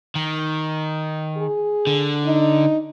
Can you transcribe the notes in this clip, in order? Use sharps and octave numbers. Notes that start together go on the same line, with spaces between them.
D#3
G#4
D3
D#4